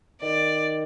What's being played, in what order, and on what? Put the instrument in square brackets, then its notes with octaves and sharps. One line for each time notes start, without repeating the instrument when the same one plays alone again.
[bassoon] D#3 [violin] D5